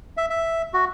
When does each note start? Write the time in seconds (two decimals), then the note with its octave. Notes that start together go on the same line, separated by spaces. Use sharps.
0.17 E5
0.30 E5
0.74 F#4